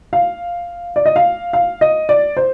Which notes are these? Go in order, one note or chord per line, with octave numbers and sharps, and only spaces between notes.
F5
D5
D#5
F5
F5
D#5
D5
C5